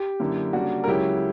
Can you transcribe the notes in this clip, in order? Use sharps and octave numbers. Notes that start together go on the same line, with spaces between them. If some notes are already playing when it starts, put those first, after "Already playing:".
Already playing: G4
F#2 D3 A#3 E4
C#3 G3 A#3 D4 F#4
A#4
C#2 C#3 F#3 C#4 E4 G4